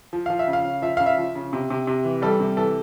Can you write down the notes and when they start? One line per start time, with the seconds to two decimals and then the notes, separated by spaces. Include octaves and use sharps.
0.13 F3
0.26 F3 F5
0.39 E5
0.48 C#3
0.53 F5
0.65 C#3
0.82 F3 E5
0.97 C#3 F5
1.06 E5
1.18 F3
1.35 C#3
1.53 C3
1.70 C3
1.87 C3
2.05 E3
2.22 G3 A4
2.40 C3
2.57 E3 A4